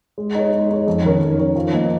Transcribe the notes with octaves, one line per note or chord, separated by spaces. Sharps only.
G#3
D#4 G#4 C#5
G#3
D#4 G#4 C#5
F2
D#3 C#4 A#4 C#5
F2
D#3 C#4 A#4 C#5
F3
A#3 D#4